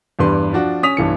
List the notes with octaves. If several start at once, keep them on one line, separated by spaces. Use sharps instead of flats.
E2 G2 G3 B4 C6
F3 D4 F#4
C#4 D#6 B6 F7
B1 G2 E3 C#7